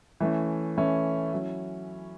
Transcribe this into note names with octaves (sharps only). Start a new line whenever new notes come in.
E3 A3 C#4 E4
E3 A3 C#4 E4
F#3 C#4 E4